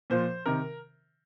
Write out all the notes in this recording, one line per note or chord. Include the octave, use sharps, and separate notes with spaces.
A#2 F3 C5
C3 D#3 A#4